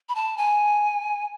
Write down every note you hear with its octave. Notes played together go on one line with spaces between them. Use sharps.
B5
A5
G#5